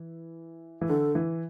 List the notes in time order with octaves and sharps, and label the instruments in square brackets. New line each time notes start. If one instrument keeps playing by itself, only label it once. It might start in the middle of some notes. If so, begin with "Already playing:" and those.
Already playing: [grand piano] E3
E3
[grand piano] D3 [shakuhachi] A4
[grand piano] E3